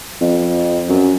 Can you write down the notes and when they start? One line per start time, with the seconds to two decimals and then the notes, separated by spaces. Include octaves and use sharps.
0.21 F2
0.89 F#2